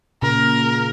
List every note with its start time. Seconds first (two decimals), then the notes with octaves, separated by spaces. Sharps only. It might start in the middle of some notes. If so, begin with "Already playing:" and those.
0.22 A#2 C#3 A#4